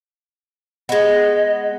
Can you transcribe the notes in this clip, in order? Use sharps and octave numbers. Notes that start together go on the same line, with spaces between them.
G#3 B3 D#5